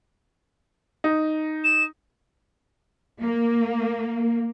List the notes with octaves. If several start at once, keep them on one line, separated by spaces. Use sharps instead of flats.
D#4
E7
A#3